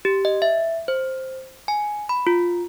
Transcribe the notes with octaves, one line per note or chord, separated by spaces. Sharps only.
G4
D#5
E5
C5
G#5
B5
F4